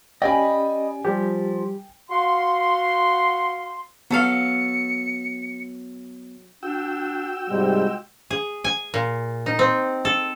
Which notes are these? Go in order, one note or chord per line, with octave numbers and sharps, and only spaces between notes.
C#4 G4 D5 D#5 G5 G#5 B5
F3 G3 G4
F#4 F5 F#5 C6
F#3 B3 A4 F5 C#7
D4 F#4 G5 E6
G#2 C3 G3 G#3
G#4
G#5
A#2
D#4
C4
A4